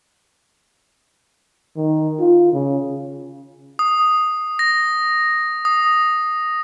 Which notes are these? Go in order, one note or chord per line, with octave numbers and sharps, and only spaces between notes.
D#3
F4
C#3
D#6
A#6
D#6